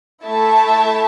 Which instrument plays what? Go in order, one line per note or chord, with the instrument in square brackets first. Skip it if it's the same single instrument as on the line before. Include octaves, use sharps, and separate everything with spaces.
[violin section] A3 E4 A4 E5 A5